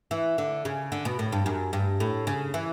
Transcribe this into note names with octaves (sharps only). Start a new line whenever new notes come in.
E3
D3
C#3
D3
B2
A2
G2
F#2
G2
A2
C#3
E3